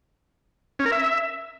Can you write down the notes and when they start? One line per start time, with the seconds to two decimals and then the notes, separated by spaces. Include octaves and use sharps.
0.79 C#4
0.86 A#4
0.92 E5